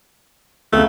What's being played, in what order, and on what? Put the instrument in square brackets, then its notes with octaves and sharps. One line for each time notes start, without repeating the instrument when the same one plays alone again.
[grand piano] C#2 C#3 [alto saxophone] A3